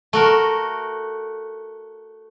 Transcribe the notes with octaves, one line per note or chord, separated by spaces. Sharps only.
A3 F#4 A#4